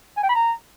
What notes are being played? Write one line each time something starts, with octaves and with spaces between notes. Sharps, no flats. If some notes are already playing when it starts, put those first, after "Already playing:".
G#5
G5
B5
A#5